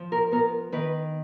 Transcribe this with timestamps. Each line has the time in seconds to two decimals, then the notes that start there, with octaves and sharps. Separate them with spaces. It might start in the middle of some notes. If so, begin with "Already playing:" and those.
Already playing: F3
0.12 A#4
0.32 B3 A#4
0.72 D#3 B4